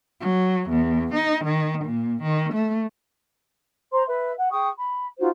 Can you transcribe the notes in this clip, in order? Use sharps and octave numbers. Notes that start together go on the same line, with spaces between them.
F#3
E2
D#4
D#3
A#2
D#3
A3
C5 A#5 C6
B4 E5
F#5
G#4 G5 C#6 D#6
B5
D#4 F4 F#4 C5